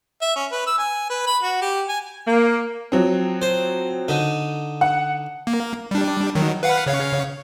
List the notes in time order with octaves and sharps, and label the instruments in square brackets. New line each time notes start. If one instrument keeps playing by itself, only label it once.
[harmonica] E5
C#4
B4
E6
G#5
B4
B5
F#4
G4
G#5
[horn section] A#3
[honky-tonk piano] F3 F#3 C4
[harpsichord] C5
D3 D#4
[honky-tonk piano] F#5
[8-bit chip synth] A#3
G3 D4
D#3 F#3
B4 F5 F#5
C#3 C#5 F5